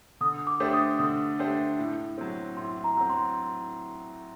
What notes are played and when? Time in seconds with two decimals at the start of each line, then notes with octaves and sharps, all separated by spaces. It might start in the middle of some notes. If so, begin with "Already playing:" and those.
0.21 D3 D#6
0.47 D6
0.60 A3 D4 G4 C5
0.69 D6
0.73 D#6
0.99 D3 D#6
1.39 A3 D4 G4 C5
1.79 A2
2.18 F#3 C4
2.57 A2 C6
2.84 A#5
2.97 F#3 C4
3.10 C6